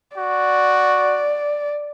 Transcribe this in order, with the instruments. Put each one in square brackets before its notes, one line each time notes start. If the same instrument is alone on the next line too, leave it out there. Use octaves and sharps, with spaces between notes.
[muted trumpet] F#4 [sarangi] D5